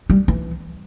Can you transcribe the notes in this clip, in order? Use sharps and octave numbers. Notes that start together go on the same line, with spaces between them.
G3
E3